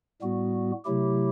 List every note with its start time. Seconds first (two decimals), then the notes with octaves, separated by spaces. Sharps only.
0.21 A2 G3 B3 F#4
0.85 C3 F#3 A3 E4 G4